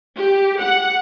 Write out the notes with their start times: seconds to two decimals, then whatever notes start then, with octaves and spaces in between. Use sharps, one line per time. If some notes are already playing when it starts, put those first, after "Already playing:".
0.17 G4
0.59 F#5